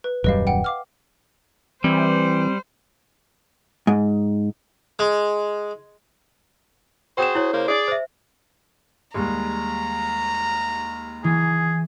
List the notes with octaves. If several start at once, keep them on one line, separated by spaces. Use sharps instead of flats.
B4
D#1 F#2 G3 B4 D#5 F5
F#5 G5
F5 D6 F6
E3 G3 C4 C5
G#2
G#3
F#4 G#4 C5 G5 E7
E4 C#5
C#3 A#3 C5
G#4 D5
C5 E5
D#2 G3 G#3 A#5
E3 G#4